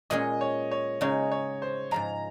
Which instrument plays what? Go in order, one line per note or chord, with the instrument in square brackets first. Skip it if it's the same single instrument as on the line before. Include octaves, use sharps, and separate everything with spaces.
[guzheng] A#2 G#3 C#4 [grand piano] D#5
[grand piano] C#5
C#5
[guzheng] C#3 G#3 D#4 [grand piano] C#5
[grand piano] C#5
C5
[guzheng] G#2 F3 G#3 [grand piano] A#5